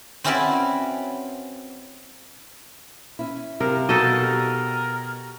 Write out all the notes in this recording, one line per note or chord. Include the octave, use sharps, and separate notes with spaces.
C4 C#4 E4 F#4 B4 D5
C#4 E4
C3 A#4 F5
B2 D#4 F#4 A4 D#5
G4 A#4